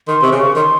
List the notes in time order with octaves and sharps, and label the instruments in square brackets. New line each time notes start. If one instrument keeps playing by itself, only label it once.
[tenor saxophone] D#3 [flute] C6
[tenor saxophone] C3 [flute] C#6
[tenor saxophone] C#3
[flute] C#6
[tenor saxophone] D#3 [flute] C6